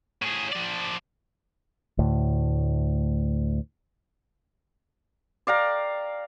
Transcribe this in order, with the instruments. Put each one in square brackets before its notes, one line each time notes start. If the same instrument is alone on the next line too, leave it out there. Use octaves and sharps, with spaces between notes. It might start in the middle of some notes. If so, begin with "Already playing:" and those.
[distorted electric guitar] A2 G#4
F3 D5
[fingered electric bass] D2 A2
[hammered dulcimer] D5 F5 G5 A#5